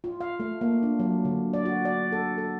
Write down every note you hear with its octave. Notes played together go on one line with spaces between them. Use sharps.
F4
F5
A3
A#3
D4
F#3
D3
D5
F#4
D5
A4
A4